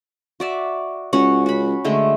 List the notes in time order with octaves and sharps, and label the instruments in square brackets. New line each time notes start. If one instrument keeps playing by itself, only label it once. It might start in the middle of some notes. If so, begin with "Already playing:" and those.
[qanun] F#4 D5 E5
[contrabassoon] C#2 [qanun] C#4 F#4 F#5
[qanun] F#4 B5
D3 G#3 A3